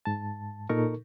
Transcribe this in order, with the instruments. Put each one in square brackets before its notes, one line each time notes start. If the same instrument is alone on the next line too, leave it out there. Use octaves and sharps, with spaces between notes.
[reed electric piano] G#2 A5
A#2 D#4 A4 A#4 C#6